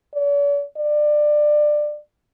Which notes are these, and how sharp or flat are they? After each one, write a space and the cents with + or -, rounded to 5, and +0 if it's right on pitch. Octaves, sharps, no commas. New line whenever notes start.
D5 -45
D5 +20